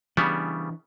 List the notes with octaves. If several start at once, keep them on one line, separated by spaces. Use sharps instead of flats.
C#3 E3 G3 B3 D4